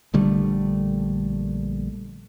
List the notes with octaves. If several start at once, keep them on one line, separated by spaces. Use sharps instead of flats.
A#1 D3 G3 A3